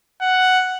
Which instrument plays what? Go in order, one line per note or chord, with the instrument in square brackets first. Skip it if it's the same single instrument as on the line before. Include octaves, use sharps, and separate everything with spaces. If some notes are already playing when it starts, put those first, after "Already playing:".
[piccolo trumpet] F#5